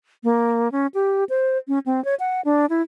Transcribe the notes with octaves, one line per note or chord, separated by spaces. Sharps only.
A#3
C#4
G4
C5
C#4
C4
C#5
F#5
D4
E4